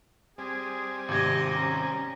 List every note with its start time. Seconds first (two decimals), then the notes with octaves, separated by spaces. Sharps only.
0.38 G3 C4 G#4 G#5
1.08 G#1 C3 D#5 D6 G#6
1.56 C#4 A#5